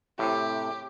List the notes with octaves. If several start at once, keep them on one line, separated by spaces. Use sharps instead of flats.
A2 C3 G4